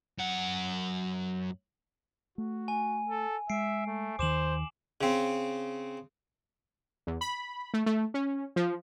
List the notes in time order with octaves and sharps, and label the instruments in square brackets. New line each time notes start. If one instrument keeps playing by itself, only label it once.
[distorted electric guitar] F#2 F#5
[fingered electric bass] A3 [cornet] F#4
[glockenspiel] G#5
[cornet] A4
[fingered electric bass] G#3 [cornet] E5 [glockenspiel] C7 D7
[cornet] A3
[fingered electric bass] D#2 D#3 [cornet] C5 [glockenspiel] D6 E7 F#7
[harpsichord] C#3 C4
[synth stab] E2
B5
A3
A3
C#4
F3